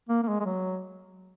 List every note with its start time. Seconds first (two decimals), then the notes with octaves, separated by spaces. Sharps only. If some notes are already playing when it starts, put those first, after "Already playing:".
0.09 A#3
0.23 A#3
0.28 G#3
0.40 G#3
0.45 F#3